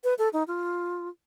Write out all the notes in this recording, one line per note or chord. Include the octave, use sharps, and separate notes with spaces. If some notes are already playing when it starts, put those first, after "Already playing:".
B4
A4
D#4
F4